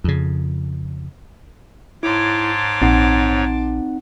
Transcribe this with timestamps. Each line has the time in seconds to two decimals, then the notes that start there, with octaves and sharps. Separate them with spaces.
0.04 F2 C#3
2.03 G#2 E4 C#5 A5 C6 D6
2.82 A#1 C4 D#4 F#5